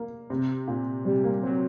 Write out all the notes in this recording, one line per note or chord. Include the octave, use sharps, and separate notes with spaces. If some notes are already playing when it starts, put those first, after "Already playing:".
Already playing: A#3
C3
A#2
C3 G3
A#3
F#3 C4